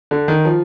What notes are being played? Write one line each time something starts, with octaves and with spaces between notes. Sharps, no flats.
D3
D#3
F3